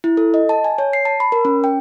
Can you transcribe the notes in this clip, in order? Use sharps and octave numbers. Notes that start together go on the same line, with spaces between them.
E4
A4
D#5
A5
G#5
C#5
C7
A5
B5
A#4
C#4
G5